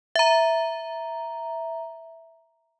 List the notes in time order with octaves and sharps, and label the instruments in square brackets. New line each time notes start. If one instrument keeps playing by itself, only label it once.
[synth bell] E5 A#5